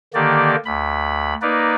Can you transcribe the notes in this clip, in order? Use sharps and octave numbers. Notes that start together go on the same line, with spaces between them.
D3 D#3 A#3 G4 D5
D2 B5
A#3 D#4 B4 D5